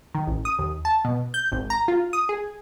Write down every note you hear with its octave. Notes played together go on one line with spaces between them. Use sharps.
D#3
A1
D#6
D#2
A5
B2
G6
G#1
A#5
F4
D#6
G#4